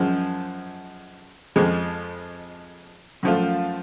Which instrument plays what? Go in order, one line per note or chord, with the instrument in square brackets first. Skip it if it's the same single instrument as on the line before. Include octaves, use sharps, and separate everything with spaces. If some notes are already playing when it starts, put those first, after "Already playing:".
Already playing: [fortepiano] F#2 F3 G#3
F2 F3 G#3
F#2 F3 A3 F4